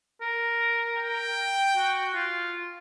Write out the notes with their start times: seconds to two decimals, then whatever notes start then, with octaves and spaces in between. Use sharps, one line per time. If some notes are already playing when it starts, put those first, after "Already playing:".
0.21 A#4
0.97 G5
1.77 F#4
2.15 F4